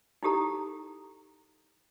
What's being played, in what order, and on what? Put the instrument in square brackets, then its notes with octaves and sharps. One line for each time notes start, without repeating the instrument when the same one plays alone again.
[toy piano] D#4 E4 G4 A4 A#5